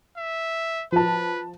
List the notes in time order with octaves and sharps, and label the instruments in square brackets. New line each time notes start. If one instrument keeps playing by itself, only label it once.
[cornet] E5
[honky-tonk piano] F3 A5 [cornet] B4